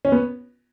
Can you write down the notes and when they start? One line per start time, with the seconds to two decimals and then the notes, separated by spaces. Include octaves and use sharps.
0.05 C#4
0.12 B3